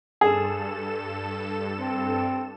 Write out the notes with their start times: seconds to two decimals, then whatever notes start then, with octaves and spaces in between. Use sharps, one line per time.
0.21 G2 G#4 A4 E7
1.79 C4